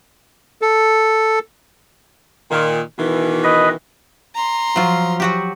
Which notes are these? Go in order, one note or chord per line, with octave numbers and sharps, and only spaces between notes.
A4
A#2 D#3
B2 D#3 E3
B4 D#5
A#5 C6
F3 F#3 F4
F#3 F#4 G4